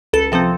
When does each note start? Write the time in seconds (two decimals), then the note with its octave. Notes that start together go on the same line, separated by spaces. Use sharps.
0.13 C#2 A4
0.32 C3 F3 C4 A4